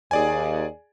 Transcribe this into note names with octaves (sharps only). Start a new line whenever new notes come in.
D#2 G#4 D5 G#5